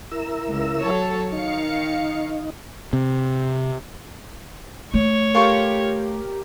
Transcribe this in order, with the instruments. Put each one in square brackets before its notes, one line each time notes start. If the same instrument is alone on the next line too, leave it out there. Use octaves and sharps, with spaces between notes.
[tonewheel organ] E4 A#4 E6
[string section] C#2
F#3 A4 C#5
[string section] D#3 F5 C#7 [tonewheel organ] D#4
[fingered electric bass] C3
[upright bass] A3 [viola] C#5
[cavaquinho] F4 A4 C#6 [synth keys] G4 A#4